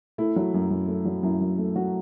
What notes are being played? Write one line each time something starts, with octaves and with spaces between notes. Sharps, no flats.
A3 E4
F#3
F#2
F#2
A3
F#3
F#2 E4
F#2
A3
F#3 F#4